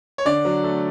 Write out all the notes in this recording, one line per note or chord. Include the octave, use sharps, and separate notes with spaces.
C#5
D3 D5
F#3
A3